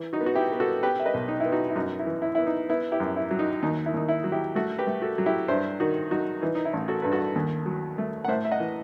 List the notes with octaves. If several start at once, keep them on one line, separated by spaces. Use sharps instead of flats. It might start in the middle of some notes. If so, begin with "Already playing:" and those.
Already playing: E3
D#4 F#4
B3
F#4
E4 G4
B3
F#4 A4
B3 G4 B4
E5
B4 D#5
B1
D#4
E4
B3
D#4 F#4
E4
F#2 D#4 F#4
E4
E3
E4
B3 E4
D#4
B3 E4
E4 G4
F#2
E4
F#3
D#4
D#2 D#4
E4
D#2 D#4
E4
F#3
E4 G4
A3 F#4 A4
G4 B4
A3
F#4 A4
F#3
E4 G4
G2 C5 E5
D#3 D#4 F#4
F#3 D#4 F#4
E3 D#4
D#4
E4
A1
F#4 A4
G2 B4
F#4 A4
D#2
F#3
A3
F#5
A2 C5 E5
E5
D#5 F#5
E3